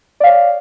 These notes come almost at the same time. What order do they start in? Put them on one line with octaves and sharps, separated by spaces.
D5 F5 C#5